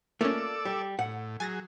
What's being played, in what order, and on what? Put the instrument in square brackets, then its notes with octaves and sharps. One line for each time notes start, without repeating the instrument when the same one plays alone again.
[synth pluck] A3 C#4 [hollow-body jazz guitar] A#3 F4 [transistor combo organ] A4 D5 E6
[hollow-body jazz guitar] G3
[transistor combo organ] A2 [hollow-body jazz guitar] F#5
[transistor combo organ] F#3 G#4 [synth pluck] G#5 A6 A#6